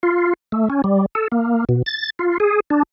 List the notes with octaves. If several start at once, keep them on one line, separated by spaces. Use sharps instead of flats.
F4
A3
C#4
G3
A4
A#3
B2
A6
F4
G#4
D4